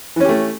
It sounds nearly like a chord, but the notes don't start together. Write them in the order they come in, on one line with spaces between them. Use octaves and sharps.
E3 C#4 G4 A3